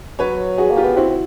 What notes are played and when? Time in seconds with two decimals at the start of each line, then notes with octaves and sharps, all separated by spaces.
0.19 F#3 B4 C#5
0.58 F#4 G#4
0.71 A#3
0.76 F4 G4
0.84 B3
0.96 C4 E4 F#4
1.10 C4